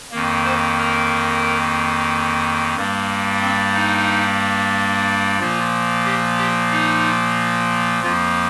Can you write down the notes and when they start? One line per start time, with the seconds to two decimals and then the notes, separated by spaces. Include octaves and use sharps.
0.12 F2 D#3 A#3
0.44 C5
0.78 A#4
2.76 G2 G3 A#3
3.41 C4
3.74 D#4
5.39 A#2 F3 A#3 F4
6.05 G4
6.38 G4
6.71 D#4
8.03 F2 F3 A#3 F4